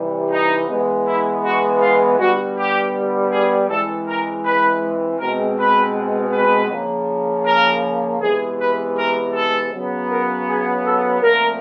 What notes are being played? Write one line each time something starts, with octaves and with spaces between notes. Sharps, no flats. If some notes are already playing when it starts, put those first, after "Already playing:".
Already playing: C3 E3 G3
D#4
E3 G#3 B3
E4
F#4
F4
D3 G3 B3 F#4
G4
G#4
E3 G#3 C4 A4
A#4
B4
B2 G#3 C4 A#4
B4
B4
C#3 F3 A#3
A#4
C3 E3 G#3 B3 G#4
B4
A#4
A4
C#3 F#3 B3
A#4
G#4
A4
A#2 F3 A3 C4 A#4